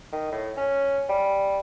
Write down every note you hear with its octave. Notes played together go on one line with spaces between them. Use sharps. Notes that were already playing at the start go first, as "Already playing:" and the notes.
D#3
A2
C#4
G3